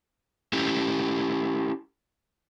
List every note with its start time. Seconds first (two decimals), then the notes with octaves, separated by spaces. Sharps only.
0.53 C#4 E4 G4